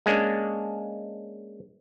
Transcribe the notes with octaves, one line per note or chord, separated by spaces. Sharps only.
G#3 A#3 C#4 D4